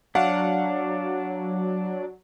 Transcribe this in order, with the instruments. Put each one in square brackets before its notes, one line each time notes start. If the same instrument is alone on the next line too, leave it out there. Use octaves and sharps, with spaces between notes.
[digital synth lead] F#3 [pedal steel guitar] D4 [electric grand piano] F5 F#5